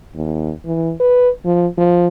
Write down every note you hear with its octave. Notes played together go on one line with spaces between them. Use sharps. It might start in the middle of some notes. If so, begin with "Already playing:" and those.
D#2
E3
B4
F3
F3